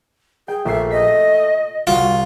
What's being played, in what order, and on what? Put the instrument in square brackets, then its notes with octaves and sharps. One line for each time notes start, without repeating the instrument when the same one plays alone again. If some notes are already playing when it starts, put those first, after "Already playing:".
[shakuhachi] G#4 [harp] G5
[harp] A#1 E6 C7 [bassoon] A3 [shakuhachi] E5
[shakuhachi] D#5 [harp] B6
[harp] C2 [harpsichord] F4 [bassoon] F#4